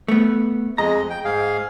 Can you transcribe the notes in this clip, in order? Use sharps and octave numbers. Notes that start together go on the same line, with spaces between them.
A3 B3
F2 G#3 D#5 A#5
G5
G#2 G#4 F5